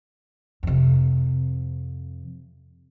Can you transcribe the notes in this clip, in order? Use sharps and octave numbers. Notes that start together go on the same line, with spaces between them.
F2 C3